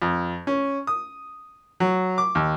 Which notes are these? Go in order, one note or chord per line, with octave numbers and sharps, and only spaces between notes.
F2
C#4
D#6
F#3
D6
D#2